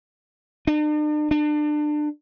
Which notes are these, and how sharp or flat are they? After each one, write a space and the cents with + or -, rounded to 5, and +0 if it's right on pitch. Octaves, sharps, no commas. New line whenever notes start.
D4 +45
D4 +30